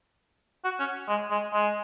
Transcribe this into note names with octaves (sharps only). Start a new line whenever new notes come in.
F#4
C#4
G#3
G#3
G#3